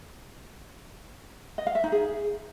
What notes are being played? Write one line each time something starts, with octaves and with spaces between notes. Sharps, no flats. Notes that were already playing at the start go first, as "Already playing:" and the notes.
D#5
F5
E5
D#4
G#4